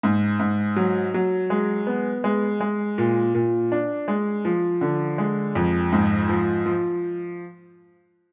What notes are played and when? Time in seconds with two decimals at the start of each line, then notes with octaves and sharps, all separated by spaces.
0.03 G#2
0.39 G#2
0.76 F#3
1.14 F#3
1.50 G#3
1.87 B3
2.24 G#3
2.60 G#3
2.98 A#2
3.35 A#2
3.72 D4
4.08 G#3
4.45 F3
4.81 D3
5.18 G#3
5.55 F2
5.93 G#2
6.29 F3
6.66 F3